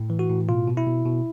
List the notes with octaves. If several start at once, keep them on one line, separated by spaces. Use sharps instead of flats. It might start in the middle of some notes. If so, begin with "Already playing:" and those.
Already playing: A2
E3
F#4
A2
B2 F4
B2
E4
B2
B2